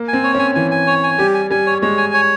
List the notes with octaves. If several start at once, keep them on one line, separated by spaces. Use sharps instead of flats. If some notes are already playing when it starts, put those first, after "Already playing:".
Already playing: A#3
G#5
C4
C#5
C#4 G#5
E3 G#5
G#5
C#5
G#5
G3 G4
G#5
G3 G#5
C#5
G#3 C#5
G#5
C#5